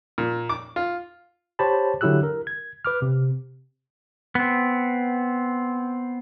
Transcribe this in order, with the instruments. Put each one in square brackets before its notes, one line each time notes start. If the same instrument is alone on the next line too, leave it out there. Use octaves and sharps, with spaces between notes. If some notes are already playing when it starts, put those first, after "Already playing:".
[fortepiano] A#2
D6
F4
[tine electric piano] G4 C5 C#5 A5 B5
D3 F#3 E4 G4 E6 F#6
A#4
G#6
B4 D6 F6
C3
[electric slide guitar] B3 C4